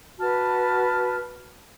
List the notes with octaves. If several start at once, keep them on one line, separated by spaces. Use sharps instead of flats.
F#4 B4 A5 F6